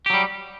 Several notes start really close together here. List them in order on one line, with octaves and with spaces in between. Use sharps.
G4 F#3 G3